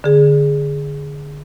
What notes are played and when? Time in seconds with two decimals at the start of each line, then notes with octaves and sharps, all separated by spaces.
0.04 D3 G#4